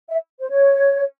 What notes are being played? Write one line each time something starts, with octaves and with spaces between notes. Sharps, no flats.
E5
C5
C#5